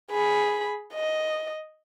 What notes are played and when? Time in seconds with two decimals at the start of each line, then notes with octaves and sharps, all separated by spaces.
0.11 G#4 B5
0.94 D#5